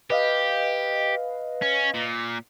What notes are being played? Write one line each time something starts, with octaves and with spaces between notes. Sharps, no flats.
G4 B4 D#5 F5
C#4
A#2